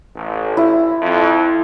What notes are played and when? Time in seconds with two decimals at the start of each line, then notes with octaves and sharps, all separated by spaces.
0.16 A1
0.57 E4
1.02 F2